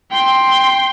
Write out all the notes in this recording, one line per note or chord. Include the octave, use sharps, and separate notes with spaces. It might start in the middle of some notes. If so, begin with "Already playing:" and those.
G5 C6